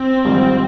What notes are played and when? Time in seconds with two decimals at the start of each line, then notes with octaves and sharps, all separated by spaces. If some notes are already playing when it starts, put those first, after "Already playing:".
Already playing: C4
0.25 A#1 G#2 D#3 G3